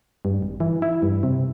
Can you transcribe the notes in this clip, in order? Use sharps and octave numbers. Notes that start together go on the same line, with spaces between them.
G2
G#1
E3
E4
G2
C3